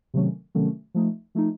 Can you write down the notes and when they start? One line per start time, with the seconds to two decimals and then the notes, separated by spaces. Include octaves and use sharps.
0.14 C3 D#3 F#3 A3 C#4
0.55 C3 D#3 F#3 A3 C#4
0.94 F3 A3 D#4
1.35 F3 A3 D#4